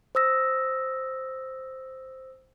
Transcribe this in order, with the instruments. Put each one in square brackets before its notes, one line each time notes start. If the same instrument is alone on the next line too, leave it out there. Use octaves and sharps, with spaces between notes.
[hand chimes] C5 D#6 E6 A#6